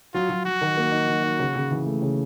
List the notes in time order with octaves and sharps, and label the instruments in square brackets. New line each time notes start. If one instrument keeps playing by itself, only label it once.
[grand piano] F#3 [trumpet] F4
[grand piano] F#3
[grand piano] F#3 [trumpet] F#4
[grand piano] D#3
A#3
D#4
F#3
D#4
C#3
C#3
E3
A3
C#3